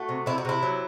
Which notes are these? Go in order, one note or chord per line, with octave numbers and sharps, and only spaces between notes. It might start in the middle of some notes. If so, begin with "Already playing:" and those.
Already playing: A3 F#4
C3
C3 E4
F#4
C3 E4
F#3